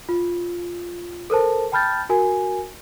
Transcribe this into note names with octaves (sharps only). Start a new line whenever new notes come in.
F4
A4 A#4 C5 A5
G5 A5 B5 F6 G6 A6
F#4 A#4 G#5